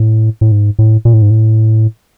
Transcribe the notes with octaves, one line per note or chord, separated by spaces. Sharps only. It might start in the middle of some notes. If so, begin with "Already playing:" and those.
Already playing: A2
A2
G#2
A2
A#2
A2
G#2
A2